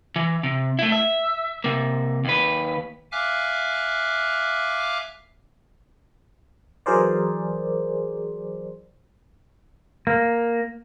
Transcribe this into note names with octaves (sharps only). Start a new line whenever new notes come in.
E3
C3
A3 E4
E5
C3 A#3
D#2 B4
E5 F5 G#5 D6 F6 F#6
E3 F#3 G#4 A#4 C5 D5
A#3